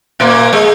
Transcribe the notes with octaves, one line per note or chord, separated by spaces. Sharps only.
A#2 A#3
G#3